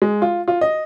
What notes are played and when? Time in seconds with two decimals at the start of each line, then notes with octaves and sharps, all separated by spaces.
0.02 G#3
0.22 F4
0.48 F4
0.61 D#5